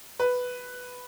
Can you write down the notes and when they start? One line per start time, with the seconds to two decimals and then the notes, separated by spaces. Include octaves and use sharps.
0.19 B4